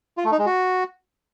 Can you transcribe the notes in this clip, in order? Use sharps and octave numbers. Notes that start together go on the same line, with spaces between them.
F4
A3
D#4
G#3
F#4